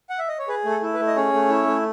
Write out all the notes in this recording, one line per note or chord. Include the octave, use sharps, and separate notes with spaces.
F#5
E5
D#5
C#5
G#4 B4
A3
A4
E4
B4
A3
D#5
C#4 G#4 C#5
A3
E4
A3